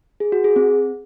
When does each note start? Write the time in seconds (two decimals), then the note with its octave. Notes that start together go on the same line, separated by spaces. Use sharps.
0.20 G#4
0.32 F#4
0.44 G#4
0.56 C4